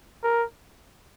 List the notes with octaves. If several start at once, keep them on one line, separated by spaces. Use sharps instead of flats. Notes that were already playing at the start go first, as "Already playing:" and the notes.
A#4